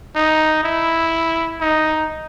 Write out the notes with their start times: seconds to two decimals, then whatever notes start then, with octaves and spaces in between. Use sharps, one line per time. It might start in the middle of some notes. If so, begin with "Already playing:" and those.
0.16 D#4
0.64 E4
1.61 D#4